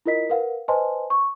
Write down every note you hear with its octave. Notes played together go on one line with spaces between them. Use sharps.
E4 F4 A#4 D#5 B6
A#4 B4 F5 F#5
B4 C5 D#5 G#5 A5 C6
C#6